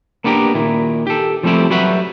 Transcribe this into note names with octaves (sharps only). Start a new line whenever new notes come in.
A#3 B3 D4 G4 A#4
A#2 D#3 E4
G4 A4
F3 G3 A3 C4 E4 G4
F#3 G3 F#4 B4 E5 F#5